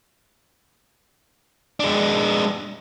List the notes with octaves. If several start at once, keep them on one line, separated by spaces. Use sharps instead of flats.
G#3 D4